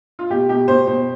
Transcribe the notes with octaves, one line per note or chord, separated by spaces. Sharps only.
F4
B2 G4
B2 G4
B2 C5
B2 C5